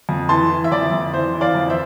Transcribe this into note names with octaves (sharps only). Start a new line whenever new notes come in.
F2
E3 A5 C6
E3
E5
F2 D5
F2
E3 C5
E3
D5 F5
F2
C5 E5